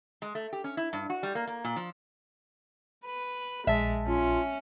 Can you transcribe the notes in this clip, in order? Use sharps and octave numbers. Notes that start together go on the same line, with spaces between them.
G#3
A3
G4
C#4
E4
G2
F#4
G3
A#3
A#3
A#2
F3
B4
A#1 G#3 E5 A5
C#4 F4